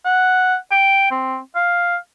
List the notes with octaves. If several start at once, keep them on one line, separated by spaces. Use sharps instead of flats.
F#5
G5
C4
F5